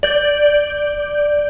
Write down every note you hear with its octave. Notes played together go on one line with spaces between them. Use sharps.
D5 G6